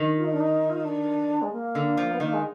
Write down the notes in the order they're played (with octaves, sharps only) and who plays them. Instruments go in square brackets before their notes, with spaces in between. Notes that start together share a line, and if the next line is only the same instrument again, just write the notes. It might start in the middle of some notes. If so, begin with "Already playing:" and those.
Already playing: [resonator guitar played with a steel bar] D#3
[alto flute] F4
D#4
D4
D#4
F4
D#4
D4
G#3
A#3
[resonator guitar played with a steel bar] D3
F3
[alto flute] B3
[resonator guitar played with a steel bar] D#3 [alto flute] A#3
[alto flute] G#3